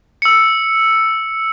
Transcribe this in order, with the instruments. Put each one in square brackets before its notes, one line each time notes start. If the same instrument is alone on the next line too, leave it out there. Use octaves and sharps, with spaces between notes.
[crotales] E6 C#7